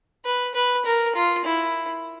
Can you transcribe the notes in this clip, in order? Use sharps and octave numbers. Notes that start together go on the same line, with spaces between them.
B4
B4
A#4
F4
E4